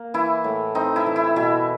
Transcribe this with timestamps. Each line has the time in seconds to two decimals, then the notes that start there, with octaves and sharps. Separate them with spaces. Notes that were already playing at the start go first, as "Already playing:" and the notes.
Already playing: A#3
0.14 E3 E4
0.44 A2
0.75 C4 D#4
0.96 E4
1.06 E3
1.16 E4
1.36 B2 E4